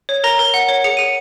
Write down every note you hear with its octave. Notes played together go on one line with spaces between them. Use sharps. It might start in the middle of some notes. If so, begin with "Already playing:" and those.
C#5
A#4 A#5 A#6
A#4
F#5
C#5
G#4 C#7
G#4 D#7